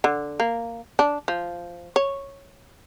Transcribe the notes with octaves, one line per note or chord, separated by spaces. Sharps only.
D3
A#3
D4
F3
C#5